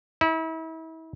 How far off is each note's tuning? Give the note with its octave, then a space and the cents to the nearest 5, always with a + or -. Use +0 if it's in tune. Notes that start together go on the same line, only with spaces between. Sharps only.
E4 -35